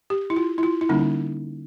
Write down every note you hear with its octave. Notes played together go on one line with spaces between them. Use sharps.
G4
E4
F4
E4
F4
E4
D3 G3 A#3 C#4 D#4